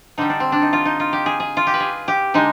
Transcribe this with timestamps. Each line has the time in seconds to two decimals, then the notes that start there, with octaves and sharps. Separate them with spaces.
0.18 D3 G3 D#4
0.30 D4
0.40 C4
0.52 D4
0.62 D#4
0.73 F4
0.85 D#4
1.00 F4
1.13 G4
1.26 G#4
1.40 G#4
1.57 F4
1.67 G4
1.74 B4
1.80 G#4
2.08 G4
2.34 D3 G#3 D#4